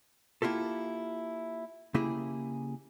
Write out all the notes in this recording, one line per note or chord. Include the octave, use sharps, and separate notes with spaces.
A#3 E4 F4 G4 A4
C#3 A#3 E4 G4 G#4